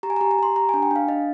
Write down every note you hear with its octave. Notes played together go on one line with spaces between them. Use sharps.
G4 A#5
G#5
G4 A#5
A#5
G4 C6
G4 A#5
D4 G#5
G5
D4 F5
D4 D#5